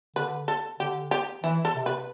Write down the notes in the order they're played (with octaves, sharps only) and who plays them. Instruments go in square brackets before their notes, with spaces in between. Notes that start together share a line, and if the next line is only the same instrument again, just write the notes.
[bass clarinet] D3 [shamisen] B4
[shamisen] A4
[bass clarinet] D3 [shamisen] G4
[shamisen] G4
[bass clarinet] E3 [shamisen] E4
[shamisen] A4
[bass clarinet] C3
[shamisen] B4